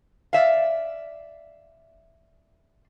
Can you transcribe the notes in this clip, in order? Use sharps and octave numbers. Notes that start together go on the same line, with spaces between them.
D5 E5 F5